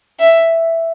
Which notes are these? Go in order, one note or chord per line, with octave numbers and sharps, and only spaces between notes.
E5